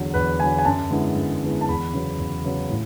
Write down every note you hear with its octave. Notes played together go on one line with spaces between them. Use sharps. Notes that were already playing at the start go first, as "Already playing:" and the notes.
Already playing: E2 D3 F#3
E2 B4
D3 F#3 G#5
G#5
F#2 A5
D3 G#3 B3 E4
F#2
D3 G#3 B3 E4
A5
E2 B5
C#3 F#3 B3
E2
C#3 F#3 B3
A2